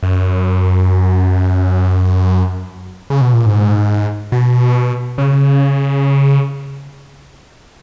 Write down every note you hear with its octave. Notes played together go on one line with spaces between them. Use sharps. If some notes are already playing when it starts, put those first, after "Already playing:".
F#2
C#3
B2
A#2
G#2
B2
C#3